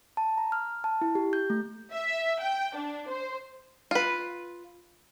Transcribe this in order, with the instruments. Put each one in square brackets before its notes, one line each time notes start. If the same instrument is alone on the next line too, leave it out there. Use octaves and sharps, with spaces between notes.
[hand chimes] A5
A#5
F6
A5
E4
G4
G6
A3
[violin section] E5
G5
D4
C5
[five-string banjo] F4 B4